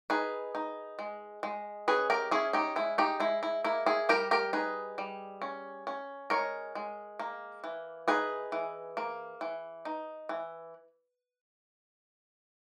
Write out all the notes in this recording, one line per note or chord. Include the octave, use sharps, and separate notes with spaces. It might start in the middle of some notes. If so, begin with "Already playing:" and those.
D#4 G#4 B4
D#4
G#3
G#3
C#4 G#4 B4
G4 A#4
C#4 E4 G#4
D#4 G4
G#3 E4
D#4 G4
G#3 E4
E4
A#3 E4
E4 G#4
G3 G4 A#4
G4 A#4
D#4 G#4 B4
G3
C#4
C#4
G#3 A#4 C#5
G#3
A#3
E3
D#4 G#4 B4
E3
A#3
E3
D#4
E3